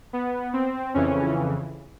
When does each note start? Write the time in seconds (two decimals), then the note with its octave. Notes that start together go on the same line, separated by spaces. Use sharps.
0.13 B3
0.53 C4
0.94 F2 C#3 E3 C#4